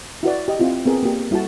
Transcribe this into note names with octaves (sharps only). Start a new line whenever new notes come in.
E4 F#4 B4 D5
G4 D#5
C4 E4 F4
B3 C4 G#4 A#4
A#3 G4
G3 E4 F#4 A4 A5